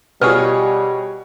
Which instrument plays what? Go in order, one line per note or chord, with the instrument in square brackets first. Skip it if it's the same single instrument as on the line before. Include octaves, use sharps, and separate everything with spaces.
[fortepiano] B2 G#4 C#5 [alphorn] G3 [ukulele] F4 D#5 [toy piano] B4